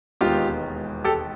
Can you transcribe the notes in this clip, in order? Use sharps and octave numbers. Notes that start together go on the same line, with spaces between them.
E1 D#2 D#3 G#3 B3 F4 G4
G4 A4